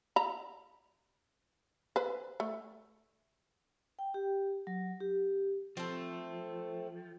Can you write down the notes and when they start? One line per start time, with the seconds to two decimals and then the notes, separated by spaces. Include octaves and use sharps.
0.16 A#5 B5
1.96 B4 C5
2.40 A3
3.99 G5
4.14 G4
4.67 F#3
5.01 G4
5.77 F3 A3 C4